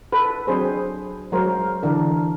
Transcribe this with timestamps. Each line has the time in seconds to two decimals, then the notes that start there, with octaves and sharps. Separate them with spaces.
0.13 A4 B4
0.47 F#3 C4 D4 G#4 C5
1.32 F#3 G#3 A#4 C5
1.83 D3 E3 D4 A#4